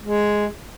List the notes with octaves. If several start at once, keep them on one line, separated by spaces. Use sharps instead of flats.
G#3